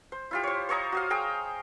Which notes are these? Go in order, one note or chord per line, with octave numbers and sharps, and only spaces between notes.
C5
E4 F4 G4
C5 C#5
C5 C#5 D#5 A#5
F#4 D#5 F5
G#4 G5 A#5